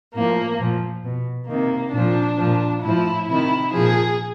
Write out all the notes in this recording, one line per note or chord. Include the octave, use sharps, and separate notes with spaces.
A2 F3 A#3
A#2 F3
B2
C3 D#3 A#3
A#2 F3 D4
A#2 F3
A2 F3 E4
C3 D#3 E4
A#2 F3 G#4